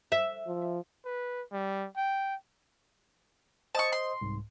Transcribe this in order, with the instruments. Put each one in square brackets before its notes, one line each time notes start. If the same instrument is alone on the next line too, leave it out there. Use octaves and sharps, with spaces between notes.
[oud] E5
[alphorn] F3
[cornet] B4
G3
G5
[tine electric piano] C5 D#5 D#6 [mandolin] A5 C#6
[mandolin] C6
[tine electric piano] C2 G#2